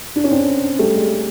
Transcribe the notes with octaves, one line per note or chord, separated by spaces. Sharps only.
D4
C#4
C4 D4
G3 A3
G#3